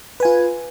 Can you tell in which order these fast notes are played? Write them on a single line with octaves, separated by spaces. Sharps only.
B4 G#5 F4